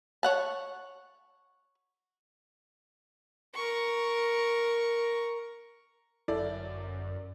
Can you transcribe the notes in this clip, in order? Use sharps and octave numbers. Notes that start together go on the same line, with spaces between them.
C#5 F#5 A5
A#4 C#6
G1 F#2 E4 A4 D5